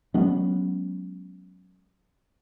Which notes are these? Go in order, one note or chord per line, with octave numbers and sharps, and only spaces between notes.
F#3 G#3 B3 C#4